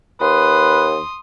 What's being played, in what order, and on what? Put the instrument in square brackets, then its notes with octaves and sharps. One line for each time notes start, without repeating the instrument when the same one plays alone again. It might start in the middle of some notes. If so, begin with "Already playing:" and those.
[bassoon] D#2 [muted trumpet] B4 [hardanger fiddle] C6 D#6